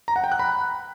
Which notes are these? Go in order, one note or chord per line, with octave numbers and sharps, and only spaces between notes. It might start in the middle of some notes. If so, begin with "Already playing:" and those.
A#5
F#5
G5
F#6
B5